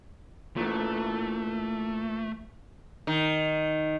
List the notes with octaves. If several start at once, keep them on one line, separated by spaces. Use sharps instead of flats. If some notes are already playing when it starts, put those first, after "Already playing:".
A#2 E3 A3
D#3